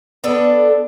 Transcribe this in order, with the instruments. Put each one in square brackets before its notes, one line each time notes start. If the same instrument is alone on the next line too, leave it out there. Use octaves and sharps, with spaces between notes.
[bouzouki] B3 D4 A4